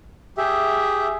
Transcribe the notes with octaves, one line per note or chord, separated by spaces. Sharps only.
G4 G#4 E5